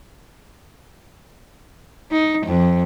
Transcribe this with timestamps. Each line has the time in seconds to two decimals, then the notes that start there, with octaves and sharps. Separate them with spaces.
2.11 D#4
2.46 F2